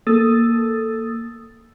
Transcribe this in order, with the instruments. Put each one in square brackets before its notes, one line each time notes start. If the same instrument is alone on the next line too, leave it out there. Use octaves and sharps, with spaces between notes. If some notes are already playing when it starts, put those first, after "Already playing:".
[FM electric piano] A#3 A4 D#6 E6 A6